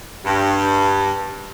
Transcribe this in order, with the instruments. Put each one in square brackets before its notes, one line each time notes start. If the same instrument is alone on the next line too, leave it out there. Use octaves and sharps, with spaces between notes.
[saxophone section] G2